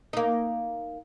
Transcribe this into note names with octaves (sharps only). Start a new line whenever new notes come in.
A#3 D#4